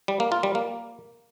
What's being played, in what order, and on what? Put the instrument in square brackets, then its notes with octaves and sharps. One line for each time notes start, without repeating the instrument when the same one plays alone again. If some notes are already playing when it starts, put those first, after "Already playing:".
[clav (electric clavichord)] G3
A#3
F4
G3
A#3